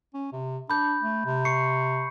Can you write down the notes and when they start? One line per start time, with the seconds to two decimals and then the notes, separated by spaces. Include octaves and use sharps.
0.14 C#4
0.33 C3
0.70 D4 B5 G6
1.02 A3
1.25 C3
1.45 C#6 C7 C#7